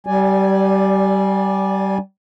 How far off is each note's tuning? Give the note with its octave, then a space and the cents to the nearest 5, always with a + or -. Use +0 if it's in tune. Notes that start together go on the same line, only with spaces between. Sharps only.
G3 -25 D5 +5 G#5 +0